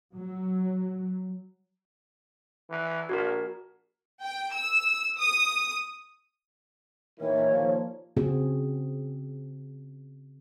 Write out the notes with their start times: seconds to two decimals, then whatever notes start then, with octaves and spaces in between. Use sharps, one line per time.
0.15 F#3
2.70 E3
3.09 A#1 F#4 A#4
4.23 G5
4.54 E6
5.18 D#6
7.20 A#2 D#3 E3 C#5
7.50 D#2 A#2 F3
8.17 C#3 C4 F#4 G#4